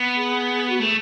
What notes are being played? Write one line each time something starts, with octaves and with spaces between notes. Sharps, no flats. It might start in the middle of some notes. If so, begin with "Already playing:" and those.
Already playing: B3
G#4
F#4
A3 G#4